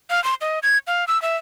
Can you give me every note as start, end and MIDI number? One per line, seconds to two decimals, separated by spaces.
0.10 0.22 77
0.24 0.34 84
0.41 0.59 75
0.63 0.78 92
0.87 1.05 77
1.08 1.20 88
1.22 1.37 76